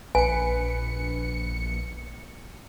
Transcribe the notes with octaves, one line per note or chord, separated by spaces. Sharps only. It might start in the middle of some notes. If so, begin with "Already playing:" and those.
A#1 B4 G#5 C#7